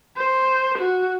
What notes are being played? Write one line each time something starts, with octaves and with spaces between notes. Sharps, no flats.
C5
F#4